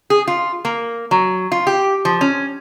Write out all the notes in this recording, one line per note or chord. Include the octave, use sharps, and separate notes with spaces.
G#4
F4
A#3
F#3
F4
G4
F3
C#4